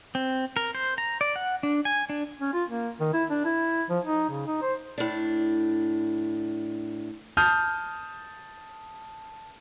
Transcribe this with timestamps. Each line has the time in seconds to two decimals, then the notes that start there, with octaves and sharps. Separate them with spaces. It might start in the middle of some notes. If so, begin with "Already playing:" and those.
0.15 C4
0.57 A#4
0.75 C5
0.98 A#5
1.21 D5
1.36 F#5
1.63 D4
1.85 G#5
2.10 D4
2.41 C#4
2.53 F4
2.70 A#3
3.00 D#3
3.13 E4
3.30 D4
3.45 E4
3.90 F3
4.04 D#4
4.29 C#3
4.47 D#4
4.62 C5
4.98 A2 D4
7.37 A5 D#6 F6 G6